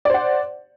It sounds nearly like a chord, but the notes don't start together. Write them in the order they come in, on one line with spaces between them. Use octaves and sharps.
D5 C5 F#5